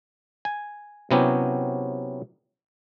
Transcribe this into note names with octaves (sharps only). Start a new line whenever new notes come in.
G#5
C3 F#3 B3 C#4 E4 G4